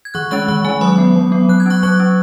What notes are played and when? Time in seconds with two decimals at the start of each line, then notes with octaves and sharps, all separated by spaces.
0.05 G#6
0.14 D#3 C#6 F#6
0.31 G#3 C#4 C#6 F#6
0.48 D#3 C#6 F#6
0.64 G#3 C#4 G#5 C#6
0.81 F#3 B5 D#6
0.98 B3
1.16 F#3
1.32 B3
1.49 F#3 F#6
1.60 G#6
1.66 C#4 C#6 F#6
1.83 F#3 C#6 F#6
2.00 C#4